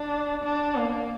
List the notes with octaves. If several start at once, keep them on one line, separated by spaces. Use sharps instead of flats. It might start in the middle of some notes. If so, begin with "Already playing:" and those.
Already playing: D4
D4
A#3